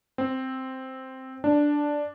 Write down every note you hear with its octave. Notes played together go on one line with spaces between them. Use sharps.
C4
D4